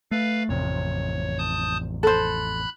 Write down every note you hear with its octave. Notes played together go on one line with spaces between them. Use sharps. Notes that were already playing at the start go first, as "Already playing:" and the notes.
A3 B4 F5
A1 F2 C3 C#5
A5 D#6 G6
A4 C5 B5 F#6